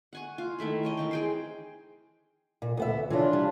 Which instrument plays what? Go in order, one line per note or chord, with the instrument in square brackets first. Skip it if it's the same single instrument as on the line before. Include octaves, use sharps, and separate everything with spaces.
[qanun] F#5 G#5 C#6
F4
D#3 A3 E4 B5
A#4 C#5 D#5
E3 C4 G5
G#4 G5 C6
[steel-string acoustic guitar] A#2
D2 B3 E5
[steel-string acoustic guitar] C#3 E3 [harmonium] D4 F4
[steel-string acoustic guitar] G3